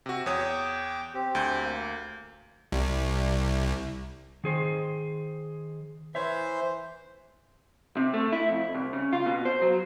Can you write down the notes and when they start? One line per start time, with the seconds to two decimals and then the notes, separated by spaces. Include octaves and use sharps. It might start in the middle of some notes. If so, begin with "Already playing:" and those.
0.06 C3 F#4
0.26 E2 C#5 G5 D6 D#6
1.14 C4 G4
1.35 D2 G6
1.64 A#3
2.72 C2
4.44 D#3 G#4 C5
6.15 E3 C5 C#5 E5
7.97 C3
8.14 A3
8.32 E4
8.49 F2
8.74 C2
8.93 C#3
9.13 F4
9.26 B2
9.45 C5
9.62 F#3